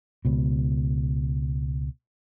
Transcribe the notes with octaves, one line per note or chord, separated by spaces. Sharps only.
C#2 B2